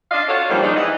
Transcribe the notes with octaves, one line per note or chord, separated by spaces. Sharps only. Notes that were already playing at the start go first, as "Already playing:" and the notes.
D4 D5 D#5 F5
F4 F#4 A4 C#5
G2 A#2 D#3 F3 G3 A#3
G#3 C4 D4 D#4
E3 D#5 F#5